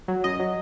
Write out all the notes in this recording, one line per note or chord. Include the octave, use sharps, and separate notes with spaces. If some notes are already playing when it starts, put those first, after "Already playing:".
F#3
F#2 D#5
F#3